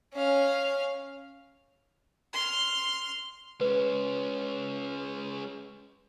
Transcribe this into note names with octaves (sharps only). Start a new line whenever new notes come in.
C#4 F5
C6 F6
G#3 C#4 B4